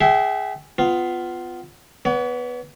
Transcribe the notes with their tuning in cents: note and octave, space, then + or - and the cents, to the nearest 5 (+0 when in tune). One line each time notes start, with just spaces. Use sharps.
G#4 +0 E5 -5 G5 -40
B3 +25 F4 +0
B3 +0 C#5 +45